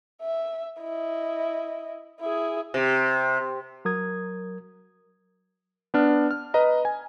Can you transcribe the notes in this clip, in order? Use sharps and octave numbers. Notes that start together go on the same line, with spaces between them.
E5
E4 D#5
E4 G#4
C3
F#3 A#4 D#6 G#6
B3 D4 F6
F6
B4 D#5 A#5
G#5